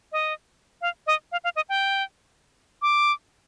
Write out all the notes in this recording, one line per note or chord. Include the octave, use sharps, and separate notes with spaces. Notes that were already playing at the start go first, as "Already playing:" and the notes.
D#5
F5
D#5
F5
F5
D#5
G5
D6